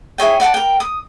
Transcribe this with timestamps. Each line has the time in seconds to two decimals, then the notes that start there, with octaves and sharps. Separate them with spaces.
0.18 E4 G#4 C#5 G5
0.40 D5 F#5 G5 A5
0.54 A#4 G5
0.80 D#6